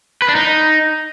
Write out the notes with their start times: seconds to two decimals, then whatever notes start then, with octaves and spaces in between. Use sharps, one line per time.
0.22 B4
0.29 D4
0.35 D#4